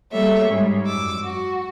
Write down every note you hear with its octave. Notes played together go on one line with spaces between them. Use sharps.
G3 A#3 A4 C#5 E5
G#2 G3 C#4
F#2 D6 E6
F#4